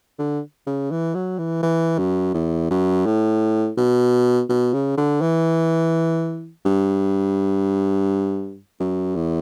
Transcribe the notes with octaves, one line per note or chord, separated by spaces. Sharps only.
D3
C#3
E3
F#3
E3
E3
F#2
E2
F#2
A2
B2
B2
C#3
D3
E3
G2
F#2
E2